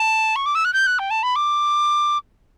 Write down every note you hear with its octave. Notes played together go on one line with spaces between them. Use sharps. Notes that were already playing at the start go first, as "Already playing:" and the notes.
Already playing: A5
C#6
D6
E6
F#6
G6
F#6
G5
A5
B5
D6